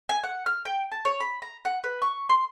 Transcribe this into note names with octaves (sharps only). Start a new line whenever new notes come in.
G#5
F#5
F6
G5
A5
C#5
B5
A#5
F#5
B4
C#6
C6